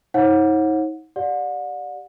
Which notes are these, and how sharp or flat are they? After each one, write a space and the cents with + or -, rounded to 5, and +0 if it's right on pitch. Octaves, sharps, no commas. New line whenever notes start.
D#4 +35 C#5 -40 F#5 -25
G4 +0 D5 +0 F#5 -40